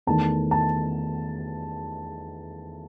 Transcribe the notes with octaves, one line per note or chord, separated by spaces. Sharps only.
E2 D#3 A3 A5
A5